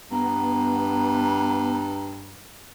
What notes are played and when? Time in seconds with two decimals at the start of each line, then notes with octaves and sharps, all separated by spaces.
0.11 G2 B3 A#5